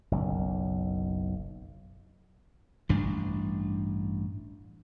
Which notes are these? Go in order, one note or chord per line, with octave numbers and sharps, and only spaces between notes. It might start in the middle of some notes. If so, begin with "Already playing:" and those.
F#1 B1
A1 G2 D4